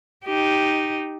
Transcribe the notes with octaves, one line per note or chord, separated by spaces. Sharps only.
D#4 G4